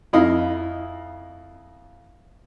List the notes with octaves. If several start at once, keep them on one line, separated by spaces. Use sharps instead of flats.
F2 E4 D#5 F5